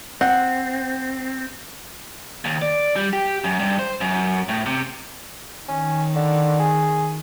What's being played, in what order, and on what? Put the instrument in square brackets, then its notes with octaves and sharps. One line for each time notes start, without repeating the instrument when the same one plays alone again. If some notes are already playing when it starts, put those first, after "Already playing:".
[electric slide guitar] C4 [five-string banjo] F#5
[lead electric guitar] D#2
D5
G3
G4
F#2
G2
C5
F#2
A2
C3
[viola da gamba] D#3 [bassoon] C#4
[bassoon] D3
G#4